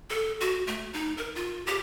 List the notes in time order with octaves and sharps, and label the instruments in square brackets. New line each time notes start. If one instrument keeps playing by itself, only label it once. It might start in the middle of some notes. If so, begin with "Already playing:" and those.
[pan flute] A4
F#4
A3
D#4
A#4
F4
G4